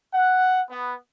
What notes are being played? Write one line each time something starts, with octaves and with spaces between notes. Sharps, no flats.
F#5
B3